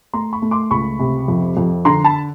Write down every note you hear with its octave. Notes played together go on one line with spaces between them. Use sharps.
A3 A#5 C6
B5 C#6
A3
C6 D6
C#2 B5 C#6
C3
F2
F2
D3 A#5 C6
A5 B5